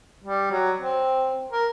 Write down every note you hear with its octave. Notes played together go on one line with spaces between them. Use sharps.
G3
F#3
C4
A#4